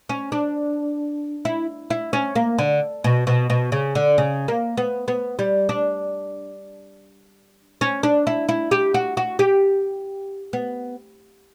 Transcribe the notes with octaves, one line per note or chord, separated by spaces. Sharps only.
C#4
D4
E4
E4
C#4
A#3
D3
B2
B2
B2
C#3
D3
C#3
A#3
B3
B3
G3
D4
C#4
D4
E4
E4
G4
F#4
F#4
G4
B3